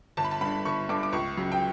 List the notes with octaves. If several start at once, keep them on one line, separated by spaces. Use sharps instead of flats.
G1 A5
B5
A5
G2 D3 B5
G1 C#6
G2 D3 D6
D6
C#2 C#6
C#3 F#3
G5